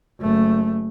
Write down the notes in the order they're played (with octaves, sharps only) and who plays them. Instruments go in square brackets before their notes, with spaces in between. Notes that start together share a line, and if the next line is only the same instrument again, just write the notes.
[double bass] F#1 A3